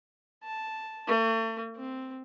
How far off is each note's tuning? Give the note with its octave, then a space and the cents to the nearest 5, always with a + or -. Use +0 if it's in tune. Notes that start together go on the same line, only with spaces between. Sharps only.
A5 -5
A3 +40
C4 +0